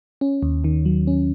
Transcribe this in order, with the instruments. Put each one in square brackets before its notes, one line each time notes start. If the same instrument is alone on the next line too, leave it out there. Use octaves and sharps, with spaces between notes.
[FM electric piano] C#4
D#2
D#3
F#3
C#4